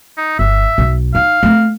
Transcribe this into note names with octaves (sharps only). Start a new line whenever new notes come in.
D#4
G1 E5
B1
D#4 F5
A3 C4